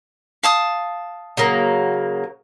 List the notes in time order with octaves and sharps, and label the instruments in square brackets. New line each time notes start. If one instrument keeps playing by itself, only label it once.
[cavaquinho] F5 A5 D#6
[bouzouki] C#3 F#3 A#3